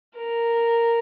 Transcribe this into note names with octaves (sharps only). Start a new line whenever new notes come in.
A#4